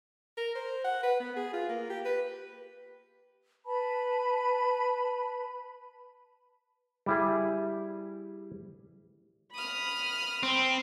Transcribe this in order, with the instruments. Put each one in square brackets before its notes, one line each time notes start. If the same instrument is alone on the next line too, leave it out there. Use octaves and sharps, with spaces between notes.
[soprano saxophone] A#4
C5
F#5
B4
B3
G#4
F4
A#3
G4
B4
[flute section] B4 A5 B5
[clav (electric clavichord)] G3 E4 G#4
[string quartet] B5 D#6 F6
[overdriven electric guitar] C4